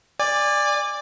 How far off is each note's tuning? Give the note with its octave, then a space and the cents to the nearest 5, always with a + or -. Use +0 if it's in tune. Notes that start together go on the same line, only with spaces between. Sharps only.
D5 +5 G#5 -30